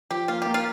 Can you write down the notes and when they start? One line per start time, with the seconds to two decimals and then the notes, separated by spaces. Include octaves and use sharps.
0.10 F3 G4
0.28 A#3 F4
0.42 A#3 G4
0.54 F4